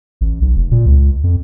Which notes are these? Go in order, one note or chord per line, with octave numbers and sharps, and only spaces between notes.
A1
B1
F1
A#2
C#2
F2